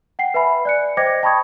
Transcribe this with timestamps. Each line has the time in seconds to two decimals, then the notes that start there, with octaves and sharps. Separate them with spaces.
0.19 F#5 G5 C7
0.34 B4 E5 G#5 B5
0.65 D5 F#6 C#7
0.97 C5 D#5 G5 D6 G#6 A#6
1.23 G5 A5 B5 C#6 D#6 G#6